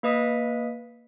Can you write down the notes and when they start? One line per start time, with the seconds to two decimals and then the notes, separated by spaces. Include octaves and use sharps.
0.03 A#3 B4 D#5 D#6 B6